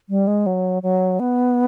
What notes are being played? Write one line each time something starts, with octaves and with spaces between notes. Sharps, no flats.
G3
G#3
F#3
F#3
B3